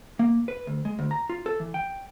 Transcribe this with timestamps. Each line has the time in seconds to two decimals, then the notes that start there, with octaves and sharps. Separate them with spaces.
0.19 A#3
0.48 B4
0.67 D2
0.85 G#3
0.99 D2
1.11 A#5
1.29 F4
1.46 A4
1.60 E3
1.74 G5